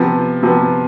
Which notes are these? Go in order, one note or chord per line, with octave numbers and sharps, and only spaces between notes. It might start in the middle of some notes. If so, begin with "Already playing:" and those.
Already playing: C3 F3 B3
C3 F3 B3